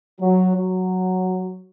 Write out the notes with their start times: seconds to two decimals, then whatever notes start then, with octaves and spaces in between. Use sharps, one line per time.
0.20 F#3
0.57 F#3